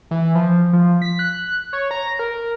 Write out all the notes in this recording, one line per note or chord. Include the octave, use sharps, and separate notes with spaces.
E3
F3
F3
B6
F#6
C#5
A#5
A#4